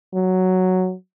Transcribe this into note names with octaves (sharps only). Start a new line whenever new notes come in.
F#3